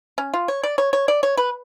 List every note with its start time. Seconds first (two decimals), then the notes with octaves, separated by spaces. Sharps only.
0.18 C#4
0.34 F4
0.48 C#5
0.63 D5
0.78 C#5
0.93 C#5
1.08 D5
1.23 C#5
1.37 B4